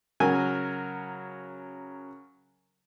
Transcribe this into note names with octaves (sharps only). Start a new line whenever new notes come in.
C#3 F#3 A#4 G#5